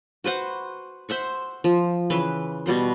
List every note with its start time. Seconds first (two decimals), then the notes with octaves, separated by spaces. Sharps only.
0.24 F#4 B4 C5 F#5
1.09 C5 E5 F#5 C#6
1.64 F3
2.10 C#3 E3 B4 C6
2.66 B2 G3 F#5 C6